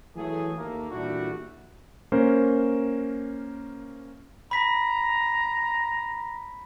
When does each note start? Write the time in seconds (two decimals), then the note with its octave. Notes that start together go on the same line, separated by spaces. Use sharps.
0.16 E3 F#3 A3 G#4
0.57 D#2 A3 A#3
0.91 A#2 E3 G3 A3 D4 F#4
2.12 A#3 C#4 A#4 C5
4.51 A#5 B5 B6